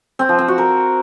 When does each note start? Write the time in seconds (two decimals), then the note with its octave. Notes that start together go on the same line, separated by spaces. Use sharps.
0.19 C4
0.29 F3
0.39 C4
0.48 F#4
0.58 A#4